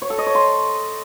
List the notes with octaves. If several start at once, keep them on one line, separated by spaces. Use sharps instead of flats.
C#5
A4
D#5
C#5
C6